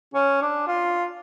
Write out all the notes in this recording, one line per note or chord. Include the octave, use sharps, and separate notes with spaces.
C#4
D4
F4